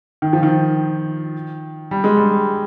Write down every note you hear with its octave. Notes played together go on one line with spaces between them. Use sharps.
D#3
F3
D#3
G3
G#3
G3